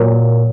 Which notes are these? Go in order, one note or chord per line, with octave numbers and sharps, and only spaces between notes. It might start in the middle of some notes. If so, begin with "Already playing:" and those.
Already playing: A#2 F#3